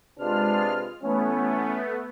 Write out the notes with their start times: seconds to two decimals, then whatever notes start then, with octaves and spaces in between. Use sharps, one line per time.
0.19 C3 G#3 D4 F4 B4 F6
1.02 E3 A3 B3 C#4